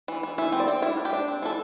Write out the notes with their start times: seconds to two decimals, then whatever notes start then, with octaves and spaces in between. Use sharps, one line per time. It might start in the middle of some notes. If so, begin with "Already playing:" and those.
0.08 E3
0.23 E3
0.38 E3 E5
0.52 C4
0.60 D5
0.68 C4
0.82 G3 E4
0.97 D4
1.05 G4
1.13 D4
1.28 C4
1.42 E3 A4